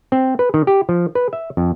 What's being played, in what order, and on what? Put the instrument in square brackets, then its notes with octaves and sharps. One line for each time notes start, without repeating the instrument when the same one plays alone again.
[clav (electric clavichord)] C4
B4
D#3
G4
F3
B4
E5
F2